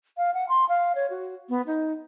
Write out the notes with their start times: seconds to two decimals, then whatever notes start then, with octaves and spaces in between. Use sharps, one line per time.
0.17 F5
0.34 F#5
0.49 C6
0.69 F5
0.95 C#5
1.10 F#4
1.49 B3
1.67 D#4